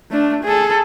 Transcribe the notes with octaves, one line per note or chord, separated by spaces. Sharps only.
A3 D4
G#4 A4